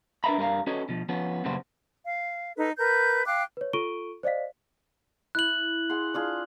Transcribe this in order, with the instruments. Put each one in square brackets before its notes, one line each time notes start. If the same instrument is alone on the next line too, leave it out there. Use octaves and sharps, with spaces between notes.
[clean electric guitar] D4 A#4 B4 E5 A#5 B5
G2 G3 A#4 B4 F5 A#5
C#4 F#4 A4 B4 C#5 D#5
B2 F3
F3 B3 C#4
F#2 A#2 C#3 G3 B3 C5
[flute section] F5
D#4 A4 B4
A#4 B4 G6
F5 G5 D6 F#6
[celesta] B4 C#5
F4 A4 C#6 D7 D#7 G7
C5 D5 D#5 F5 B6
[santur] E4 [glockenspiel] F#6 F#7
[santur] G#4 F#5 C6
D4 F4 G#4